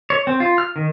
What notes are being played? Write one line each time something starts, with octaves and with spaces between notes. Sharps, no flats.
C#5
C4
F4
F6
D#3